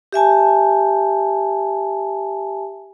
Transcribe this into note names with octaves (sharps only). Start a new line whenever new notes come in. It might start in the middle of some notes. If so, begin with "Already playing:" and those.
G4 E5 G#5 A5